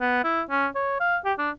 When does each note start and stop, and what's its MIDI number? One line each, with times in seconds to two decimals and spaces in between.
0.01 0.23 59
0.24 0.42 64
0.50 0.67 61
0.75 0.97 73
1.00 1.17 77
1.25 1.33 67
1.38 1.50 62